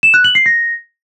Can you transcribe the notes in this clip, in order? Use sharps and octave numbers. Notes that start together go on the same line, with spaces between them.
E7
F#6
F#7
C7
A#6